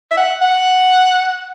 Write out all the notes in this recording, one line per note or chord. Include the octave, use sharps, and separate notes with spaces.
E5
F#5
F#5